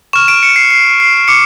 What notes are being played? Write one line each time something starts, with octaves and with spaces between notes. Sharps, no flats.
C#6 F6 E7
D7
C#7
C7
C7
C7
D6 C#7